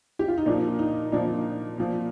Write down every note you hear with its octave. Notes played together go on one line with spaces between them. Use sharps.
G4
F4
D#4
A#2 F3 D4
D#4
A#2 F3 D4
A#2 F3